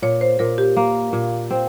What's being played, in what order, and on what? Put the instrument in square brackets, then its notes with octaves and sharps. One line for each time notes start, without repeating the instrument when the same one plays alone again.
[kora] A#2 [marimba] C#5
[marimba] C5
[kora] A#2 [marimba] A#4
[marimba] G4
[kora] A#3
A#2
C4